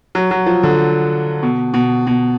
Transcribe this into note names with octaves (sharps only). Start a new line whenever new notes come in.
F#3
F#3
F3
D3
B2
B2
B2